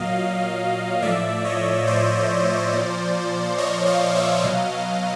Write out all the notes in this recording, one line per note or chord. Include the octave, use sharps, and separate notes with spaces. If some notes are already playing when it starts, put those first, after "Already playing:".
Already playing: A#2 F#3 D#5 F5
A2 F3 D5 E5
C#5 D#5
C5 D5
A#2 F3
C#5 D#5
D#5 F5
D5 E5
B2 F#3 D#5 F5